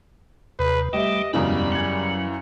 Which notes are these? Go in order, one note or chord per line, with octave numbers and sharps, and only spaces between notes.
D#2 C3 B4
G3 A3 G4 D#5 E5
E1 F#2 C#3 E3 G3 B3 D#6
F#3 G#6 F#7